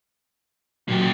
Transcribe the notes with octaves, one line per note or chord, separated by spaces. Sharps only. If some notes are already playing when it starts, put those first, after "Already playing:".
A#2 F#3 G4